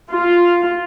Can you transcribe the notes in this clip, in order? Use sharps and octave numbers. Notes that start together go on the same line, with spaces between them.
F4